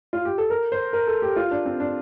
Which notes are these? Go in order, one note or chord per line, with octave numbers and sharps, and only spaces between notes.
F4
G4
A4
A#4
C5
A#4
A4
G4
F4
D4
C4
D4